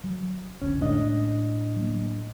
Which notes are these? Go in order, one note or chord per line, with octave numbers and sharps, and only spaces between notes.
F#3
F1 B1 D3 C#4
A2 G#3 D4 D#5
F#3 A#3